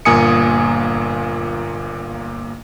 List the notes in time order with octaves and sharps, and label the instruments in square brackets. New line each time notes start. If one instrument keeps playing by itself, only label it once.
[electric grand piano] G1 A#2 A#3 G#5 D#6 C#7